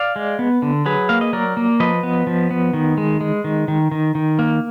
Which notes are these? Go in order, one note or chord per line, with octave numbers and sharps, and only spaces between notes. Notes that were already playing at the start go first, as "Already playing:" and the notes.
Already playing: D5 F5
G#3
B3
D3
F#3 G#4 B4
A#3 F5
D#5
F#3 A#4 D5
A#3
F3 B4 D#5
B3
F3
B3
D#3
G#3
G#3
D#3
D#3
D#3
D#3
A#3